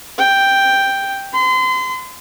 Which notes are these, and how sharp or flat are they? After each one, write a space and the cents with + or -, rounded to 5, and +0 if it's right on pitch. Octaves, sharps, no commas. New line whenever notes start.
G5 +5
C6 -35